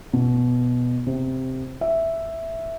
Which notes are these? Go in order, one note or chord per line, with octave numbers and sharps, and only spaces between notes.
B2
C3
E5